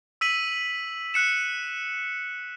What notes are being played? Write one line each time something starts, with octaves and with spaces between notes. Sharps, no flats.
E6 B6 D#7 F#7
F#6 C#7 E7